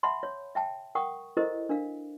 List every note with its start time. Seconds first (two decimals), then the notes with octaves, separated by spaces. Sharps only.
0.03 E5 F#5 A5 B5 C6
0.23 C#5
0.55 E5 G5 A5
0.95 A#4 F#5 G5 C#6 D#6
1.37 E4 G4 A4 A#4 C5 D#5
1.69 D4 A#4 F5